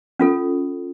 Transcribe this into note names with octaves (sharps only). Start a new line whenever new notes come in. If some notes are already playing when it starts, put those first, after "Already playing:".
C#4 F4 A4